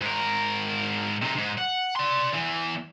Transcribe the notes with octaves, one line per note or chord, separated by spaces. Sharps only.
G#2 A#4
C3 D#4
G#2
F#5
D5 C6
E2 E3